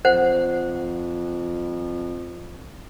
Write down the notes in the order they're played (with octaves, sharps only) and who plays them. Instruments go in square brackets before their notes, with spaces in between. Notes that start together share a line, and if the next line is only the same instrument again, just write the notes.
[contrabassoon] F2 [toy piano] C5 F#5